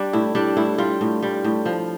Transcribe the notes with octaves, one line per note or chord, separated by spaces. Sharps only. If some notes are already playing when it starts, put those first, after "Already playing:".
Already playing: G3 D4
A2 E4
G3 D4
A2 E4
G3 F4
A2
G3
A2
F3